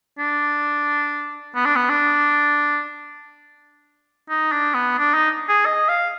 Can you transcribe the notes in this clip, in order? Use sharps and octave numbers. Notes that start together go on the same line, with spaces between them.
D4
B3
D4
B3
D4
D#4
D4
B3
D4
D#4
G#4
D#5
F5